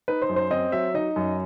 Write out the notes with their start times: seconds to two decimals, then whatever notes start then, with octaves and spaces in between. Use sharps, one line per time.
0.08 D#4 B4
0.22 C5
0.29 F#2
0.36 C5
0.51 C4 D#5
0.72 F#3 E5
0.94 D#4 D#5
1.16 F#2